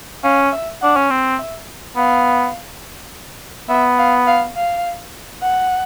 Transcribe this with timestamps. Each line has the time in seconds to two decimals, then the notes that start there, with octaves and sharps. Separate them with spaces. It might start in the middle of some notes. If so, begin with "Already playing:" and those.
0.23 C#4 F5
0.53 E5
0.82 D4 F#5
0.96 C#4
1.10 C4
1.39 E5
1.96 B3 F5
3.69 B3 E5
3.99 F5
4.27 F5
4.56 F5
5.42 F#5